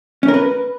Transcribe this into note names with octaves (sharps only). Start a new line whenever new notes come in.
C#4
A#4
B4